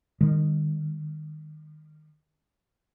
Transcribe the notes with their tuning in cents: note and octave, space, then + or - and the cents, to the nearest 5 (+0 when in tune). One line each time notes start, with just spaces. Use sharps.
D#3 -20 G3 +45